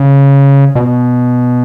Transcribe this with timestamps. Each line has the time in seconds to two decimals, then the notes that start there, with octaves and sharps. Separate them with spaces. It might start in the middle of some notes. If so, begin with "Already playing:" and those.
Already playing: C#3
0.75 B2